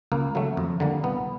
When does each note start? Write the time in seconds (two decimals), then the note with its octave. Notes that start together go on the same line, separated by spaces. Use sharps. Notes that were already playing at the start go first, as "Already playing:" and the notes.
0.12 C#2 A#3
0.35 C#3 F#3 A3
0.57 F2
0.80 D3 G3 A#3
1.03 C2 B3